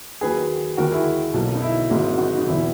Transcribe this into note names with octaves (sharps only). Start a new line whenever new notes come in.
D#2 D#3 F#3 A#3 G#4 B4
D#2 D#3 G#3 F#4 A#4
E4 G#4
B1 B2 F#3 A#3
D#4
E4
G#1 G#2 F#3 A#3
D#4 F#4
D#4
E1 E2 B2 E4